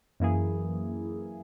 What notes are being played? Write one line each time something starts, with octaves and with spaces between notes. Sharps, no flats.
F#2 E3 A#3 E4 G#4